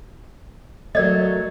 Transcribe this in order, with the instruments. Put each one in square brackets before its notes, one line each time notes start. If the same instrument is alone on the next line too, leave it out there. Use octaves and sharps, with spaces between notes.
[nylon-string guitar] F#3 A3 [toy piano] A#4 D5 D#5